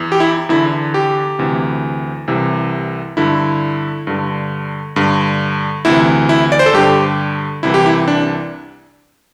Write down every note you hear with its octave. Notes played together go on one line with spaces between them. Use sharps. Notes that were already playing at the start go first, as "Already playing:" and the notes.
Already playing: E2 E3
G4
E4
E2 D3 E4
G4
D2 C3 E3
C2 C3 E3
G2 D3 E4
G2 D3
G2 D3
D2 C3 E3 E4
E4
D5
C5
A4
G2 D3 G4
C2 C3 E3 E4
G4
E4
D4